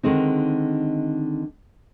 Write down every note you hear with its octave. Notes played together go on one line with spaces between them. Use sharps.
D3 D#3 G#3 C4 D#4